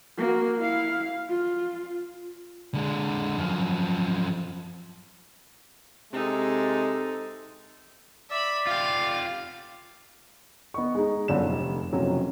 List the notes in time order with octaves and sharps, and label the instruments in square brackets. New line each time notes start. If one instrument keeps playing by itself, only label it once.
[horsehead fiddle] A#3 F#4
E4 F5
F4
[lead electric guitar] D3 G#3
F#2 F3
[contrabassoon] C3 [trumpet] G#3 [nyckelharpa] D#4 A4
[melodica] D5 [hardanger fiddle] E5 B5
[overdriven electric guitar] F4 G4 [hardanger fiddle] F5
[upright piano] B3 D#5 C#6
G#3 D#4
G1 F#2 D3 E7
F1
F#1 F2 C3 F#3 C#4